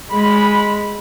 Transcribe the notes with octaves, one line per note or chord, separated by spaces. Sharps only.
G#3 B5